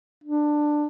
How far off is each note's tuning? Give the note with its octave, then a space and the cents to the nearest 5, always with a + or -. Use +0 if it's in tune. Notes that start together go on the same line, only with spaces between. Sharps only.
D4 +15